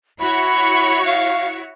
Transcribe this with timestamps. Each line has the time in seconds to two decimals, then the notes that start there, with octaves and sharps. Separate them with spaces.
0.20 E4 F#4 C#5 B5 C#6
1.06 F5